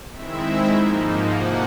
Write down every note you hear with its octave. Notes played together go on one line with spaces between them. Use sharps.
D#3 G#3 C4 E4 E5
E5
G#2 F3 A#3 D#4
C3 F3 A#3 F#5